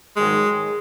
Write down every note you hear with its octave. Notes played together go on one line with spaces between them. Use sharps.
G#2 D#3 F#3 G#3